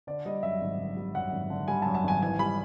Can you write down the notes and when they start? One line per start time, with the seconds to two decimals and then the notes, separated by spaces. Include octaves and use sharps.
0.07 D3 D5
0.25 G3 D#5
0.43 F#2 E5
0.61 G#1
0.78 D3
0.97 G3
1.14 F#2 F#5
1.32 G#1
1.50 D3
1.68 G3 G#5
1.82 A5
1.86 F#2
1.95 A5
2.04 G#1 G#5
2.21 E3 G#5
2.39 G3 B5